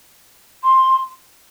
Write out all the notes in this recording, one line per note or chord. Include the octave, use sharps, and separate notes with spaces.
C6